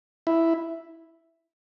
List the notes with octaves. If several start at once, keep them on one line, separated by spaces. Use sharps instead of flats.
E4